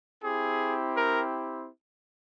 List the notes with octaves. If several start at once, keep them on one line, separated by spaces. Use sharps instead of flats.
C4 E4 G4 G#4
A#4